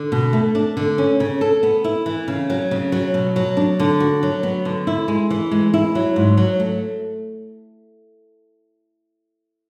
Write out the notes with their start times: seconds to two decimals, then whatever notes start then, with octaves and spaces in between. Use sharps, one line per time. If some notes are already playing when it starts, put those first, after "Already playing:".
Already playing: D3
0.12 B2
0.33 A3
0.55 D4
0.77 D3
0.98 C#4
1.20 C#3
1.41 A4
1.63 B3
1.84 E4
2.06 E3
2.28 C#3
2.50 F#3
2.71 C#3
2.92 F#3
3.14 B2
3.36 F#3
3.57 D4
3.80 D3
4.00 F#4
4.23 F#3
4.43 B3
4.65 D3
4.87 E4
5.08 G#3
5.30 E3
5.51 G#3
5.74 E4
5.95 F#3
6.16 G#2
6.37 F#3
6.60 A3